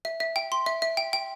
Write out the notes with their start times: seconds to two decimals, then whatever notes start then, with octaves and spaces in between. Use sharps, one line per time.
0.05 E5
0.20 E5
0.36 G5
0.52 C6
0.66 E5
0.82 E5
0.97 G5
1.13 G5